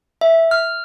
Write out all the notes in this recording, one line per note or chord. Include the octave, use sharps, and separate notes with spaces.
E5
F6